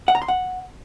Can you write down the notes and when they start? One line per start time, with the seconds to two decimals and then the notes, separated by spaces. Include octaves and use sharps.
0.08 F#5
0.15 A#5
0.22 C6
0.28 F#5